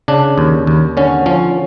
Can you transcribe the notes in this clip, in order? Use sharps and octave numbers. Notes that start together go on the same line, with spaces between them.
C#3 D4
D#2
D#2
D3 C#4
F3 C#4